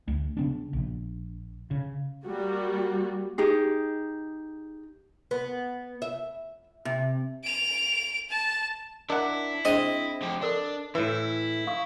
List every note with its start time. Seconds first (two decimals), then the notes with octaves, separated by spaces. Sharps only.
0.08 D2
0.37 C#3 B3 D4
0.73 A#1
1.71 C#3
2.25 G3 A#3 F#4
3.38 D#4 G4 G#4
5.31 B3
6.02 E5
6.85 C3
7.44 D7 F7
8.30 A5
9.10 D4 E4 A#4 D#5 F#5 A#5
9.65 C4 D4 G#4 C5 D#5
10.23 F3 G4
10.42 D4 A4 A#4 D5
10.95 A2 E3 E4 B4
11.67 F5 C#6 D#6